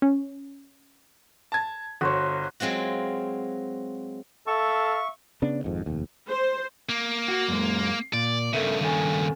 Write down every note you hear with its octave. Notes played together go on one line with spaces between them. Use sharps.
C#4
A5 G#6
G1 F#4 C5 C#5
F#3 G#3 C4 F4 F#4
A4 E5 F5 C#6
C#3 B3 D4
G#1 F2 G#2
F1 D#2
C5
A#3
F#4
F#2 G#3
A#2 D5
G2 C#3 A4 A#4 E5
D#3 A4 G#5